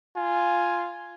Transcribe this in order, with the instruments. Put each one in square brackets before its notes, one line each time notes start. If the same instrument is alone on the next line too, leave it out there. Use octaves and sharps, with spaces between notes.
[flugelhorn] F4 [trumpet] G#5